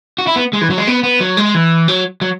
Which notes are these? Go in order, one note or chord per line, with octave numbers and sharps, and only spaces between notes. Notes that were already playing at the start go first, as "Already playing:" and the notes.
F#4
E4
B3
G#3
E3
F#3
G#3
B3
B3
F#3
G#3
E3
F#3
F#3